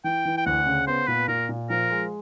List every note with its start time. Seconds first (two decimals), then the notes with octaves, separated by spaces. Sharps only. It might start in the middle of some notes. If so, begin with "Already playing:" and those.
0.04 E3 G5
0.25 E3
0.37 G5
0.46 D2 F#5
0.66 C#3
0.87 B3 C5
1.07 A#2 B4
1.28 A#2 A#4
1.49 A#2
1.70 F3 A#4
1.90 G#3